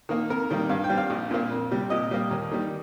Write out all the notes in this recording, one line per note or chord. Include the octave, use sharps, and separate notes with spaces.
D#3 A#3
F2 A#4
D#3 G3 A#3
G2 F5
G5
G3 C4
F5
A#1
A#2 A#3
F2
C3 G3
A#2 D#5
G3 A#3
D#2
D#3 G3